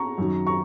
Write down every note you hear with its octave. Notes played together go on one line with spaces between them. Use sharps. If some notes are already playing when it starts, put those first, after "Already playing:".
Already playing: A#5 C#6
F#2 D#3 F#3
A#5 C#6